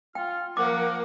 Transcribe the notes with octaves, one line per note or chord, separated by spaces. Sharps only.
F4 G5 F6
F3 A#3 A#4 F#5 D6